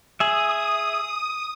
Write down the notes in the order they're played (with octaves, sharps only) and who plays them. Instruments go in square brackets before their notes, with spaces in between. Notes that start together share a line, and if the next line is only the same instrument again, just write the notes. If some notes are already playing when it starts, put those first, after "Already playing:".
[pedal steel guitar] G#4 E5 [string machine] D#6